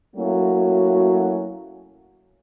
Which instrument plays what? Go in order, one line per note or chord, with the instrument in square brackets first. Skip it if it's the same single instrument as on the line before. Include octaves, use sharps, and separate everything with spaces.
[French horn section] F#3 A3 A#3 C#4 E4 F#4